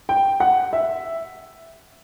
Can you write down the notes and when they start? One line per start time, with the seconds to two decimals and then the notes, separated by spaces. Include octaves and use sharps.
0.09 G5
0.40 F#5
0.73 E5